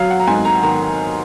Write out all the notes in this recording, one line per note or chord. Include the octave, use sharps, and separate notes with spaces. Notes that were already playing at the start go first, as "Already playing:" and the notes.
Already playing: F#3 F5
F#5
A#5
G#2 G#5
A#5
D#3 A#5